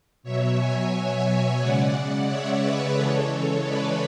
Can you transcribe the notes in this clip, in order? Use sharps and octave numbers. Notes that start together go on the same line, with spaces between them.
B2 F#3 C#5 E5
E5 G#5
E5 G#5
C#3 G#3 D5 F#5
C#5 E5
B4 D5
C#3 E3 G#3 A4 C#5
B4 D5